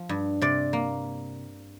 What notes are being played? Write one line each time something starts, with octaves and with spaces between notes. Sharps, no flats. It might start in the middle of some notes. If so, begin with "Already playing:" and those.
Already playing: F3
G2
C3 D5
A#3